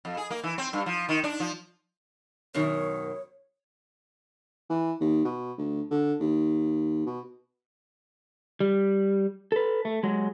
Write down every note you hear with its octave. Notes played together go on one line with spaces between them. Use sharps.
F2
G#4
A#3
E3
C4
G2
F3
D#3
D4
F3
F#2 B2 D#3 C#5
E3
D#2
B2
D2
D3
D#2
B2
G3
A4 B4
A3
F#3 G#3